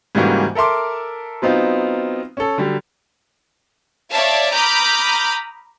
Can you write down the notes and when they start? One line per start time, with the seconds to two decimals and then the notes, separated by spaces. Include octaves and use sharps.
0.15 G#2 C#3 E3 G3 A#3 F#4
0.55 A4 A#4 E5 C6 D6
1.42 F#3 B3 C4 D#4 F4
2.37 C#4 A4
2.58 D3 F#3 G3
4.11 C#5 D5 E5 F5 A5
4.52 A#5 B5 D6 D#6 F6 G6